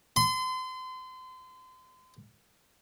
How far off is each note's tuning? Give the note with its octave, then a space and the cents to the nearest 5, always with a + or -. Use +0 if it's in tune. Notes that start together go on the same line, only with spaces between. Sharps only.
C6 -35